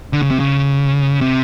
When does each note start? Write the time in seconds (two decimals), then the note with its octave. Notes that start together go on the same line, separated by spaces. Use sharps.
0.13 D3
0.23 C#3
0.31 C3
0.40 C#3
1.21 C3